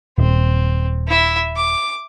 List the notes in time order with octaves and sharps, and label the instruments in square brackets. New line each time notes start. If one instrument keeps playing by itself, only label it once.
[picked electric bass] D#1 [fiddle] C4
[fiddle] E4 E5
D6